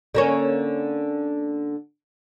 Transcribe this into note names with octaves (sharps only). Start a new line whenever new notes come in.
D3 A#3 C#4